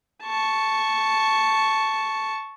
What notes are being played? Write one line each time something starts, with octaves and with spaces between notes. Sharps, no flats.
A5 C#6